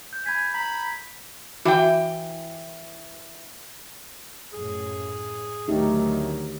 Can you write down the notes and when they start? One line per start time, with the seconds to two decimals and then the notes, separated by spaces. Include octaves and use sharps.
0.13 G6
0.26 G#5 B5 G#6 B6
0.54 A#5 B5
1.65 E3 F#4 G5
4.53 F#2 A2 G#4
5.68 D2 D#3 F#3 A3 D#4 G4